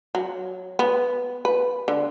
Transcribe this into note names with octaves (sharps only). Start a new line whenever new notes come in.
F#3
B3
B4
D3